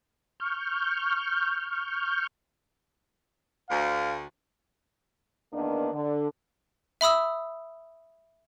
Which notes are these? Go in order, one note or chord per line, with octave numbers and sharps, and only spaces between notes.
C#6 F6 G6
D2 F5
E2 D#3 A#3 B3 D4
D3
E5 B5 D#6 E6